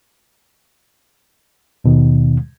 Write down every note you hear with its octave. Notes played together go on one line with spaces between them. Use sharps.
D#2 B2 D#3